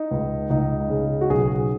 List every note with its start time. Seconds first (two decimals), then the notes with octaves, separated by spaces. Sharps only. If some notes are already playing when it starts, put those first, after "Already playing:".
Already playing: D#4
0.11 C#2
0.50 C#2 D#4
0.89 C#3
1.21 F#4
1.30 B1 G#4